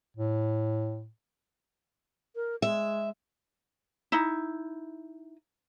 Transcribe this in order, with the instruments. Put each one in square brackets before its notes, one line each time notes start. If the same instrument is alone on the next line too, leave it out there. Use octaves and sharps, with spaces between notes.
[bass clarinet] A2
[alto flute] A#4
[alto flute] G#3 [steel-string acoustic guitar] E5
[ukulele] D#4 E4